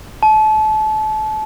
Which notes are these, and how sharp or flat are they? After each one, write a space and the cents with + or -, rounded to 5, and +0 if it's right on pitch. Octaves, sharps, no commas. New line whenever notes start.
A5 -30